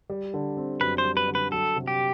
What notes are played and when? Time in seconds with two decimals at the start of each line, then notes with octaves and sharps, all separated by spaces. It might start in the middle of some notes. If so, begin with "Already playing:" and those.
0.10 G3
0.34 D3
0.57 C4
0.81 F#2 B4
0.98 C5
1.05 G3
1.17 B4
1.28 D3
1.35 B4
1.52 F#3 A4
1.76 C3
1.88 G4